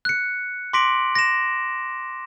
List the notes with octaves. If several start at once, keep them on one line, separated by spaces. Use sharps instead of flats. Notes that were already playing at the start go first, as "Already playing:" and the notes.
F#6 C#7
C6 D6 A#6 B6 D7 F#7
A#6 E7